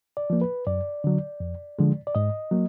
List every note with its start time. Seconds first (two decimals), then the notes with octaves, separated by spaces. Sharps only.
0.17 D5
0.30 F3 A#3
0.42 B4
0.67 F#2 D5
1.04 D3 F#3
1.40 F2
1.79 D3 F3 G#3
2.07 D5
2.15 G#2 D#5
2.51 F#3 A#3